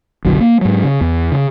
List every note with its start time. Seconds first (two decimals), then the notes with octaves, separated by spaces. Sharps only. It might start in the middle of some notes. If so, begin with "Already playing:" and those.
0.25 F#1 B1 D3 F#3
0.40 A#3
0.61 G#2 F#3
0.84 C#3
1.01 E2
1.32 C#3